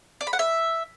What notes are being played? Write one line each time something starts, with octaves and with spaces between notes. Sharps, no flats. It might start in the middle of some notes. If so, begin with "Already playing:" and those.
D5
B5
F#5
E5